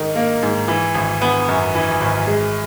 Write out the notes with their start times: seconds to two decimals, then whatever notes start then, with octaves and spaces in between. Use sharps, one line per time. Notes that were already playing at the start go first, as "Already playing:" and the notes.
Already playing: G#2 D#3 D#4
0.16 A#3
0.43 G#2
0.68 E3
0.95 G#1
1.22 B3
1.49 F#2
1.75 E3
2.01 G#1
2.27 G#3